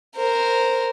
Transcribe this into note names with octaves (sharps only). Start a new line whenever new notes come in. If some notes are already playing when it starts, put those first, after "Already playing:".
A#4 C5